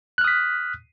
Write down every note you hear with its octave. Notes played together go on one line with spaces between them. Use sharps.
D#6 F6 F#6 B6